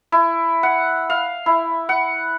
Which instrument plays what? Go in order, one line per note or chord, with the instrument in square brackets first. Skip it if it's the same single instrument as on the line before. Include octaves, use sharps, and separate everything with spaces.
[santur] E4
F#5
F5
E4
F#5